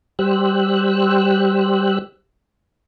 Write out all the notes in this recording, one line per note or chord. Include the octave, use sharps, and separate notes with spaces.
G3 G4 C5 E6 F#6